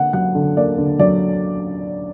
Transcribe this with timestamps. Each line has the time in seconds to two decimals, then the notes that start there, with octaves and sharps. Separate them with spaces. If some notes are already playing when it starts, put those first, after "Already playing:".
Already playing: D3 A#3 F#5
0.13 F#3 F#5
0.35 D3
0.57 A#3 D5
0.78 D3
0.99 F#3 D5